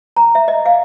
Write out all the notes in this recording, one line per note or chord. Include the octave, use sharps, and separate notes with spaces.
A#5
E5
D#5
F5